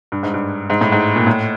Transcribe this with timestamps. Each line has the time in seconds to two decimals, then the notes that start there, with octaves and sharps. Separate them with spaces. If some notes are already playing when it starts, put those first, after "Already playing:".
0.12 G2
0.23 G#2
0.34 G2
0.70 G#2
0.81 A2
0.92 G#2
1.16 A#2
1.27 A2